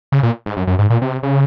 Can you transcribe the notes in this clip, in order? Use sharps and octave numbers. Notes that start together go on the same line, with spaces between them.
C#3
A#2
G#2
F#2
F#2
G#2
A#2
C3
C#3